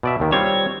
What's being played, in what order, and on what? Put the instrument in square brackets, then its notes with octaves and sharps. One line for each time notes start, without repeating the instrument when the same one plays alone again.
[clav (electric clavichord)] B2 D5 E5
D#2 D#3
[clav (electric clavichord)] G3 C4 F4 [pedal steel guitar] C#5